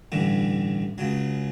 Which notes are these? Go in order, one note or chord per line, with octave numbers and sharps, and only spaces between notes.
A1 G2 D3
C#2 C#3 F#3